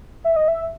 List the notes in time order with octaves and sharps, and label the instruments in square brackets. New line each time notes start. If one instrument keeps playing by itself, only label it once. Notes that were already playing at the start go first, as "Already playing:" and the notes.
[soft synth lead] E5
D#5
E5